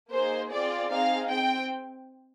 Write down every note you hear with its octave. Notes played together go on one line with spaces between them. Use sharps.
A#3 D#4 G#4 C5
C4 F4 G#4 D5
C4 D#4 G#4 F5
C4 G5